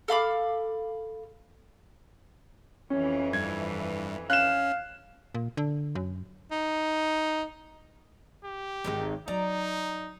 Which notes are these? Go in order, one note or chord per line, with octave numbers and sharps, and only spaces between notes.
A4 F5 B5 D6
F2 E3 C#4
G2 G#6
C#4 F5 F#6 E7
A#2
D3
F#2
D#4
G4
G#1 G#2 D#3 G#3 D#4
F#3 D#4 D5 A#5